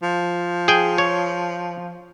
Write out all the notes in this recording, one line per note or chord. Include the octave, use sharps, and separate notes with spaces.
F3
G#4 G5
C#5